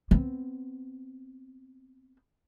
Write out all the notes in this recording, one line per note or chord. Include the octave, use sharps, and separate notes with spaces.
B3 C4